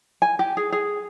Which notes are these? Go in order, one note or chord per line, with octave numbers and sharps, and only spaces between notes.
G#5
G4
G#4
G#4